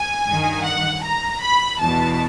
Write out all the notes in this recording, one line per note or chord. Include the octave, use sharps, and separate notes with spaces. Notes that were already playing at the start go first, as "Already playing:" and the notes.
Already playing: G#5
G2 D#3
F#5
A#5
B5
E2 B2 A5